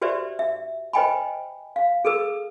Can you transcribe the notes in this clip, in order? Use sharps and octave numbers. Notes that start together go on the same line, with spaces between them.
F#4 G4 B4 C5 D5 E5
E5
B4 C5 D#5 G5 G#5 B5
F5
G#4 A4 B4 E6